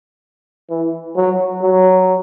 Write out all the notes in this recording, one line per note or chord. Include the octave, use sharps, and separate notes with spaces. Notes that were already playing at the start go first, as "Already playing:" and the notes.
E3
F#3
F#3